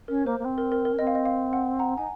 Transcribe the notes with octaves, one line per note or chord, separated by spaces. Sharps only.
C#4 A#4
A#3 C5
A#3
C4
A#4
A#4
A#4
C#4
C4 D#5
F5
D#5
F5
F#5
F#5 A#5
D#4 G#5